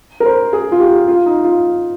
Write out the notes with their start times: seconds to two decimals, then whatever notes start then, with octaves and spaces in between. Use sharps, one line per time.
0.20 A#4
0.26 C5
0.53 G#4
0.72 F4
0.80 G4
1.08 F4
1.26 D#4
1.44 F4